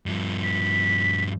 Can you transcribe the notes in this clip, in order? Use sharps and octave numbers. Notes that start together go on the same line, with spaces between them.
G2 F3
B6